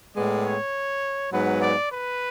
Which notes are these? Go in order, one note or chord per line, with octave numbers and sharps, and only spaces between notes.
A2 G#3 B3 D5
C#5
G#2 F#3 B3 B4
D5
B4